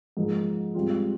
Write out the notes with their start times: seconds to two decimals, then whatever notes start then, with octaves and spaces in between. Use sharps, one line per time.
0.17 G#2 F3 A#3 D#4
0.74 G#2 G3 C4 F4